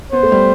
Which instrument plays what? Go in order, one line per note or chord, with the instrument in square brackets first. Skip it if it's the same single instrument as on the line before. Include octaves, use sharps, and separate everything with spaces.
[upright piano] B3 [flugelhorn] C5
[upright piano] A3
G3